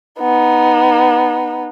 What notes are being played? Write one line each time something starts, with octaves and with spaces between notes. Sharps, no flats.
B3 D#4